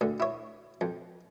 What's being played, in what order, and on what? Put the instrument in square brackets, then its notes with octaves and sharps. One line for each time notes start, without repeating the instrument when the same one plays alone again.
[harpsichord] D2 D3
E4 C#5
F2